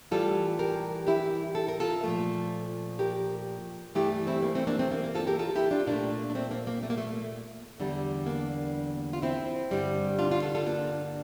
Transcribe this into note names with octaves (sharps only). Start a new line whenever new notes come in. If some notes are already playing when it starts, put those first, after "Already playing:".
A2 E3 G3 F4 A4
G4 A#4
E4 G4
A4
A#4
F4 A4
A#2 F3 A3
G4 A#4
G2 E3 A3 E4 G4
C4 E4
A#3
A3 C4
A#3 D4
A3 C4
A#3
A#3
F4 A4
G4 A#4
F4 A4
E4 G4
D4 F4
A#2 A3 A#3 D4
D4
A3 C4
A#3
A#3
A3
A#3
A3
E2 D3 G3
A#3 D4
F4
C4 E4
G2 D3 G3
D4 F4
D4 F4
F4 A4
F4 A4
A#3 D4